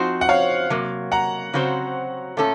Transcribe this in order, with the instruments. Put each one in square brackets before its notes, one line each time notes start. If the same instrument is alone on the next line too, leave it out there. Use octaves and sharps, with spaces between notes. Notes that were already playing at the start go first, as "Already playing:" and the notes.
Already playing: [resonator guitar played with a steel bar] F3 C4 D#4 F#4 C5
[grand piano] F#5
C#5 F5
[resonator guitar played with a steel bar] C3 F#3 A#3
[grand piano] F#5 A#5
[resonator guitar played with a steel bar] C#3 F#3 C4 F#4 C5
A#2 A3 C#4 A4